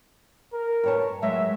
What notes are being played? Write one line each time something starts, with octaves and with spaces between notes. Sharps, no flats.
A#4
G2 C#5 A5
F#3 G#3 E5